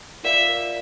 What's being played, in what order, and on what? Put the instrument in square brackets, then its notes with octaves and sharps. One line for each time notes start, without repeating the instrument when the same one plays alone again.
[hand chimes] F4 A#4 D5 F5 [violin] E5